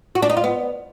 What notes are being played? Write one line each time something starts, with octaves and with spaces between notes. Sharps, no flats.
F#4
D4
D#4
F4
B3